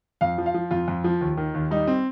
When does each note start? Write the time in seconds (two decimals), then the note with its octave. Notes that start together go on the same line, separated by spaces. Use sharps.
0.21 F2 F5
0.38 F3
0.46 F5
0.54 F3
0.71 F2 F4
0.88 F2
1.04 F3
1.21 D#2
1.37 D#3
1.54 D#2
1.71 G3 D#4
1.87 C4